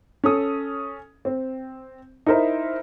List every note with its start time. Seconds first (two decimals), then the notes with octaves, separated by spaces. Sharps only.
0.24 C#4 A4 D#6
1.25 C4
2.26 D#4 E4 A#4 C5 E5